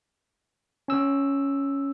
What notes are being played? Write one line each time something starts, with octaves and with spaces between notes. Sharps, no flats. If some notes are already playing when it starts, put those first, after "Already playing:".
C#4 E6